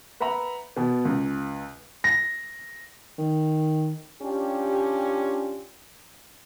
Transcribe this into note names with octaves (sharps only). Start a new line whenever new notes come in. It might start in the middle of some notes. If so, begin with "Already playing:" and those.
B4 E5 F#5 A#5 B5
B2 B3
C#2
A#6
D#3
C#4 D4 F4 G4